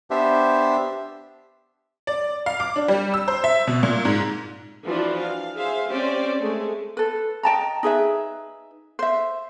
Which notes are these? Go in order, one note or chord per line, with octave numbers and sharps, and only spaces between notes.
B3 D4 G4 C5 E5
D5
F5
D6
D4
G3
E6
C5
E5
B2
A#2
G#2
E3 F3 D4 F4 F#4 C5
F5
G#4 C5 E5 F5
C4 C#4 G4 C5 D5
G#3 A3 G#4
A4 B4
D#5 G5 A5 A#5
D#4 G#4 B4 E5
C5 E5